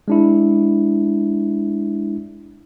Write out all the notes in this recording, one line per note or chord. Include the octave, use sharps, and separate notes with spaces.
G#3 D4 E4